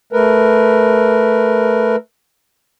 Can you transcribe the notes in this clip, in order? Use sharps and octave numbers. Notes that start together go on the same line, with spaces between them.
A3 A#4 B4